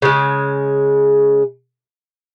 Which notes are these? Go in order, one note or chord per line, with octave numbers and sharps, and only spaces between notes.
C#3 G#3